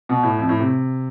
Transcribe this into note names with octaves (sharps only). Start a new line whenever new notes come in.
B2
A2
F2
A2
C3